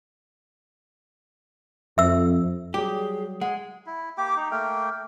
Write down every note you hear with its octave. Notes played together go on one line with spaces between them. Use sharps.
F2 E5 E6
F#3 G3 G4 G#4
G#3 F#5
E4
A#3 G4 G5 D6
D#4
A3 A#3 A#4 G5